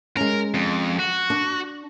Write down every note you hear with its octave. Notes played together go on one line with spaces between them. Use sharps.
G#3 C#4 A#4
F2
F#4
D4